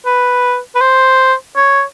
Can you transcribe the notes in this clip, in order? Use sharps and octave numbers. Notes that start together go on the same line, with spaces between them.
B4
B4
C5
C#5